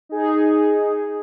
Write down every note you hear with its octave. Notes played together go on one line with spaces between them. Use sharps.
D#4 G#4